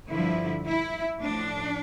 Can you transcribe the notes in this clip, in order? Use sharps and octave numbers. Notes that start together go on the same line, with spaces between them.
G2 D3 F3 E4
E4
A2 F3 D4